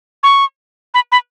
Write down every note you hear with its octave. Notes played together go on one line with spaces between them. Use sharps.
C#6
B5
B5